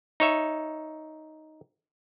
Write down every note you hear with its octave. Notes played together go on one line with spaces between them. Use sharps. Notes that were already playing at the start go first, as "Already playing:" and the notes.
D#4 C#5 E5